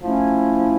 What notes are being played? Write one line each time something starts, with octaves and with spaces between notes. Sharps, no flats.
F3 A3 C#4 E4